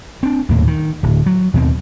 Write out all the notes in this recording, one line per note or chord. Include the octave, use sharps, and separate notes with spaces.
C4 D4
D#1 D#2 A2 A#3
D#3
D1
F#3
D#2 B2 C4